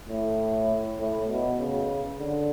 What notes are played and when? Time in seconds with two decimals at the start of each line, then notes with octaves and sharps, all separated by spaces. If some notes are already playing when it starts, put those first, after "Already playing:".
0.09 A2
0.99 A2
1.29 B2
1.59 C#3
2.19 D3